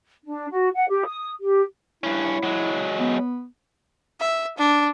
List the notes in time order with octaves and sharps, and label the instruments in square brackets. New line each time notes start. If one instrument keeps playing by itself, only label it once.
[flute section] D4
F#4
F#5
G4
D#6
G4
[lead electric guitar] G2 C#4 [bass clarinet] E4
[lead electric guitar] F#3 G#3
[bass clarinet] B3
[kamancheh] E5
D4